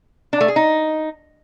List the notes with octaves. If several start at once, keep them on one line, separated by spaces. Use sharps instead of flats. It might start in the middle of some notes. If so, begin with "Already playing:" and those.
D4
A3
G#4
D#4